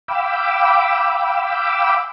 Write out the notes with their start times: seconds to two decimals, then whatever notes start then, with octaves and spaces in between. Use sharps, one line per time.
0.08 F5 G5 B5 D6 E6